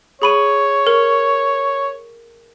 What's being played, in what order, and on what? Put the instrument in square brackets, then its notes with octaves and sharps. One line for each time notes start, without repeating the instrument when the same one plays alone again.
[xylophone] G#4 B5 D#7 [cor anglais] C#5
[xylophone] A#4